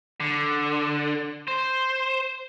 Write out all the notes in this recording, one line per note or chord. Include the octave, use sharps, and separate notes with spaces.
D3
C5